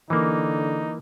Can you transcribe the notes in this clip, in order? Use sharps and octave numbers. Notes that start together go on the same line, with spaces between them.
D3 E3 A#3 D#4